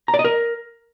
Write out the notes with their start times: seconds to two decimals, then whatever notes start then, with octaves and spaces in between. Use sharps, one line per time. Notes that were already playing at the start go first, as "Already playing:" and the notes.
0.08 A#5
0.14 D5
0.19 D#5
0.24 A#4